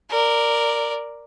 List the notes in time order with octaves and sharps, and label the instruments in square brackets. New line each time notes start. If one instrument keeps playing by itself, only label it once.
[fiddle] A#4 D5